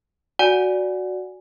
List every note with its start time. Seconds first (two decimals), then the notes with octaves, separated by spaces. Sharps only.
0.39 F#4 D5 F#5 G#5